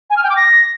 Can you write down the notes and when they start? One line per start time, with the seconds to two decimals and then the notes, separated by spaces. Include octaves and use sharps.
0.10 G#5
0.17 F6
0.23 G5
0.30 D6
0.36 A#6